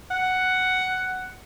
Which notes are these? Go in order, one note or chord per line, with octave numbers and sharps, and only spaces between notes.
F#5